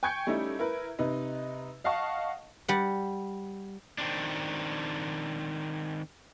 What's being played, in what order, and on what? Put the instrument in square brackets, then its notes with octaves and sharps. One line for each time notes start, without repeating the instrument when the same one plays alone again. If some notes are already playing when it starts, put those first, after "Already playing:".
[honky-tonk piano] G5 G#5 C#6 G6 G#6 C#7
G3 A3 C#4 D#4 E4
E4 A#4 B4
C3 D#4 B4
D#5 F5 F#5 A5 C#6
[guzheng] G3 F#5
[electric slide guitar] D#3 C4 D4